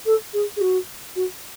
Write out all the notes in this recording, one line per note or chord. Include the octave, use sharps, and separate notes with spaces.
A4
G#4
G#4
F#4
F#4